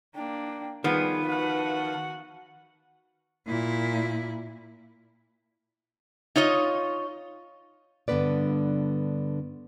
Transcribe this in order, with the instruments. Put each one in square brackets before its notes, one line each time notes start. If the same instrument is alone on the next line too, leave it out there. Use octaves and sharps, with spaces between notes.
[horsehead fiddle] A#3 D4 [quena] G5
[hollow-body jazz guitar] D#3 [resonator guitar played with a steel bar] F3 B3 [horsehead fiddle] G3 G#4 [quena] B4
[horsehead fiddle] F#4 F#5
[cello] A#2 E4
[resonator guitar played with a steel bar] D#4 F4 C#5 D#5
[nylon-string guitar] G2 D3 B3 C#4 B4 D5